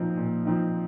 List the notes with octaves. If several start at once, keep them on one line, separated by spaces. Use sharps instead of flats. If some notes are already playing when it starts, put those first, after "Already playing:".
Already playing: A#2 F3 C4 D#4
A#2
F3 C4 D#4